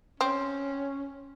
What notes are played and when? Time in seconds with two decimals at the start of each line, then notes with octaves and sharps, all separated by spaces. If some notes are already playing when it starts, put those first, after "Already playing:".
0.21 C4 C#4